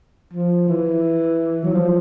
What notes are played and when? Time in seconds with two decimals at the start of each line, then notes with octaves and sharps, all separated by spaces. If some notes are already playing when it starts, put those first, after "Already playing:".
0.33 F3
0.68 E3
1.64 F#3
1.73 F3